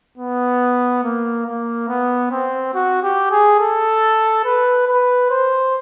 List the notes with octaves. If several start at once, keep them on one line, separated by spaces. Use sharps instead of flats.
B3
A#3
A#3
B3
C4
F#4
G4
G#4
A4
B4
B4
C5